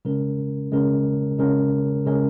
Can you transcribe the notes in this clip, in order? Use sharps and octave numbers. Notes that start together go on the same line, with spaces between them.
C#3 G#3 C#4 A#4
C#3 G#3 C#4 A#4
C#3 G#3 C#4 A#4
C#3 G#3 C#4 A#4